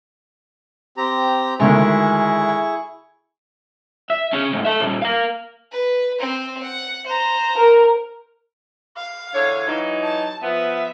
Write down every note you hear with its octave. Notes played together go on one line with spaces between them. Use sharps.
C4 G4 A#5
D2 D#3 G#3 E4 G#4 C#6
E5
C#4 G#4
G#2 A3
A4 E5
A#2 G3
A#4 F5
B4
C4 C5
F#5
C5 A#5
A#4
F5
E2 D3 C#5
E3 F#3 D#4
A5
F3 B3 E5